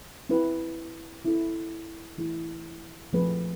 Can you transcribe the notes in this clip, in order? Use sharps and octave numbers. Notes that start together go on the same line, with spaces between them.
C4 E4 B4
C4 E4 A4
E3 A3 E4 G#4
F3 A3 C4 G#4 B4